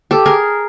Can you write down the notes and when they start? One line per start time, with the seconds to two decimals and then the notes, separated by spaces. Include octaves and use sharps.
0.11 G4 A4
0.26 G#4 A#4